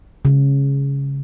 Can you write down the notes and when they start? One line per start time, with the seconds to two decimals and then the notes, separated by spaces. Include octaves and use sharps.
0.25 C#3